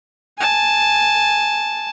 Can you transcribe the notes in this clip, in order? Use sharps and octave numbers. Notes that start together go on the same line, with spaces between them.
G#5 A5